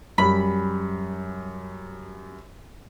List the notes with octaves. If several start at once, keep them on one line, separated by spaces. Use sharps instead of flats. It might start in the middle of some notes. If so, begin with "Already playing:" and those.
F#2 G3 B5